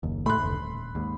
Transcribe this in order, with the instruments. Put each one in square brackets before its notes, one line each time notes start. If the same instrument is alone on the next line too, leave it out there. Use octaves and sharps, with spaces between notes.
[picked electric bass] F#1 D#2
[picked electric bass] A2 A3 [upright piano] B5 C6 F#6
[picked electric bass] F1 D2
D#1
D#2 G#2